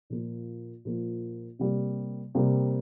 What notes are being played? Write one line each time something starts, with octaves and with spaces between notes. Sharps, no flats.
A#2 F3 A#3
A#2 F3 A#3
C3 G3 A#3
C3 G3 A#3